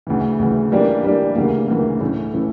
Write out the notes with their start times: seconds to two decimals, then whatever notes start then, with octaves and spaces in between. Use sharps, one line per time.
0.07 D2 C#3 E3
0.39 D2 C#3 E3
0.72 E3 G3 A#3 D4 G4
1.04 E3 G3 A#3 D4 G4
1.36 D2 C#3 E3 A#3
1.68 D2 C#3 E3 A#3
2.00 A2 E3 A3 C#4 E4
2.33 A2 E3 A3 C#4 E4